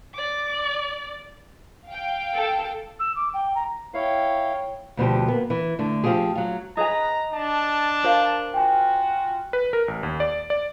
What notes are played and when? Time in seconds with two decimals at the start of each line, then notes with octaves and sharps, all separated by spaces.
0.14 D5 D6
1.86 F5 G5
2.35 A4
3.00 E6
3.16 D6
3.34 G5
3.55 A#5
3.94 E4 C#5 F5 G5
4.97 D2 B2 F3 G4
5.28 A#3 B3
5.50 E3
5.79 D3 A3
6.04 F3 C4 F4 G4 G#4
6.35 F#3 F4
6.77 D#4 G#4 B4 D#5 G#5 A#5
7.33 D4 A5
8.04 A#4 C5 F5
8.54 F4 F#4 G5 G#5
9.53 B4
9.73 A#4
9.88 A1
10.03 D#2
10.20 D5
10.50 D5